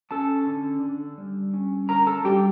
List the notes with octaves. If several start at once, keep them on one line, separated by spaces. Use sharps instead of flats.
C#4 A4 A5
D3
D3
G3
C#4
D3 A#4 A#5
A4 A5
G3 G4 G5